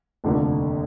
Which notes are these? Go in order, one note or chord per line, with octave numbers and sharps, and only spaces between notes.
F1 D#2 D3 F3 A#3